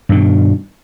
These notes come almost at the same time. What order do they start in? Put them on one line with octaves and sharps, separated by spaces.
G2 D#3 B2